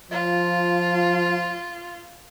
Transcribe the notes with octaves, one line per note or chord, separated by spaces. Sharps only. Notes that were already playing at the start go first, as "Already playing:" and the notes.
F3 F4